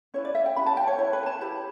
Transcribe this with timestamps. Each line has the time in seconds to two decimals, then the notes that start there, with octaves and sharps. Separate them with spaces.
0.14 C#4 E4 B4 C#5
0.25 D5
0.35 E5
0.46 G5
0.56 C#4 G4 B4 B5
0.66 A5
0.77 G5
0.88 C#5
0.98 E4 B4 C#5
1.13 B4
1.26 A5
1.41 E4 G4 B4 B5